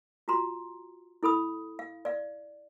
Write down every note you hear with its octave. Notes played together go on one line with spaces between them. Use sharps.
F4 F#4 A#5 C6
E4 A4 B5 D#6
F5
D5 F5